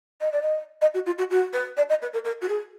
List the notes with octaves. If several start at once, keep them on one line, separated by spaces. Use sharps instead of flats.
D#5
D5
D#5
D#5
F#4
F4
F#4
F#4
B4
D5
D#5
B4
A#4
A#4
F#4
G#4